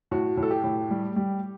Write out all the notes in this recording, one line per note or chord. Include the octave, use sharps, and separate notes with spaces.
A2 F#4
A2
A4
G4
A2
G3
G3